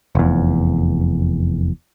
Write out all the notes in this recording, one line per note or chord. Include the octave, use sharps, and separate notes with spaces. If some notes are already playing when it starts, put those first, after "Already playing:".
F1 E2